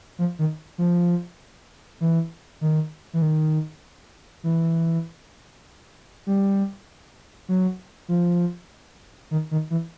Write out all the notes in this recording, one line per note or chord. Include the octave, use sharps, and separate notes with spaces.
F3
D#3
F3
E3
D#3
E3
D#3
E3
G3
F#3
F3
D#3
D#3
E3